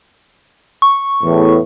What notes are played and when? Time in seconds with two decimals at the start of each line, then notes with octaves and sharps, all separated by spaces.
0.82 C#6
1.23 E2 A2